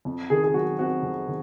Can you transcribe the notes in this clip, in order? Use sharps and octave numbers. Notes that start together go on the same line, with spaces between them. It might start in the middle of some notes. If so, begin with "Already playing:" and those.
F2
D#3 G#4
G#4
F#3 F#4
C4 F#4
F2
D#3